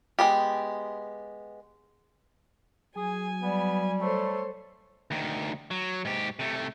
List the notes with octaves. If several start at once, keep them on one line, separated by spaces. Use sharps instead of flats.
G#3 B3 G4
F#3 G#4 G#5
G3 B3
A3 A4 C5 C#5
D2 D#3
F#3
G#2 G4
C3 A3